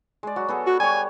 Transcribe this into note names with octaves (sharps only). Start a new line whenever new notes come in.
G#3 D5
F#3 F#4
B3 G#4 A4
F#4
G3 C#5 G#5